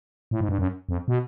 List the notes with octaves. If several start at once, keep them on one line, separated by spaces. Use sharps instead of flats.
A2
G#2
G2
F#2
F2
B2